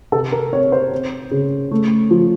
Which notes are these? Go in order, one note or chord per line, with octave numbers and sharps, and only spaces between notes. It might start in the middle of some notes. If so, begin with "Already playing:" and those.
C3 A4
A#4
C4 C#5
C5
C4
C#3
A3
F3